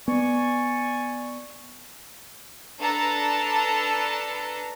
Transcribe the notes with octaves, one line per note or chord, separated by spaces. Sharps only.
B3 D5 G#5 C#6
D4 A4 B4 A5 A#5